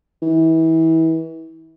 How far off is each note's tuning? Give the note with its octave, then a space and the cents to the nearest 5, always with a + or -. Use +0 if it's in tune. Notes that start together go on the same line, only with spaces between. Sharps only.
E3 -30